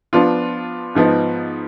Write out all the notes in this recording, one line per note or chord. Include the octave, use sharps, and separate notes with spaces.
F3 B3 D4 F4
G#2 F3 B3 D#4